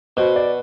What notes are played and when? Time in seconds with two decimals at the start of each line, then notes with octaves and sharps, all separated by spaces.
0.17 B2 C5
0.36 D5